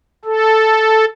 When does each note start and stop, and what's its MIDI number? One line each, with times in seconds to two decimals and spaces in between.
0.25 1.05 69